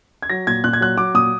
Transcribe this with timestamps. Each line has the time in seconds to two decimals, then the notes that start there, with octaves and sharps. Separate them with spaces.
0.22 G#6
0.30 F#3 A#6
0.47 A#2 G#6
0.64 A#2 F#6
0.73 G#6
0.81 F#3 F#6
0.97 F#3 D6
1.14 A#2 D#6